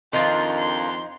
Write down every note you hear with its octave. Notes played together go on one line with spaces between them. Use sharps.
F2 D#3 D4 F4 A#4 C6
C6